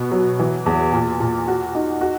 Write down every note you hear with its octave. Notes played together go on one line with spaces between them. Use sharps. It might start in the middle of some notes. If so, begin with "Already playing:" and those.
Already playing: B2 B3
F#3
E3
E2
A#2
A#2
F#4
D#4
F#4